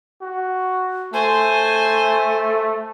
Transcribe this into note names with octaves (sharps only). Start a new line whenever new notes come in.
F#4
A3 C5 G#5